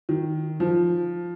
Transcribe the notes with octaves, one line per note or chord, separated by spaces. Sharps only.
D#3
F3